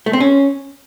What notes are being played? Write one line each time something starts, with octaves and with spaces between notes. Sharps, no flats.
A3
C4
C#4